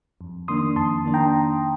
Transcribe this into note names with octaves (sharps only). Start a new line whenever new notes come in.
F2
D#3 A#3 D4 C6 D#6
F2 A5 C6
D#3 A#3 D4
G5 A#5